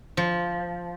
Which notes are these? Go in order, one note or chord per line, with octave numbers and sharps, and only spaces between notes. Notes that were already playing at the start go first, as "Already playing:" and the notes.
F3